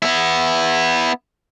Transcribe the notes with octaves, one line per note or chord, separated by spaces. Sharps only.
B3 E4